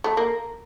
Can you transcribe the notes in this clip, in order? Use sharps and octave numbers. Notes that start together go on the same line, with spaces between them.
A3
A#3